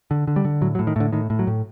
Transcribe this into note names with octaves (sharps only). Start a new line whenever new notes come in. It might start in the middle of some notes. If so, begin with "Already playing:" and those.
D3
D3
G3
D3
A2 F#3
F#3
A2
D#3
A2 D3
A2 D#3
A2
F#3
A2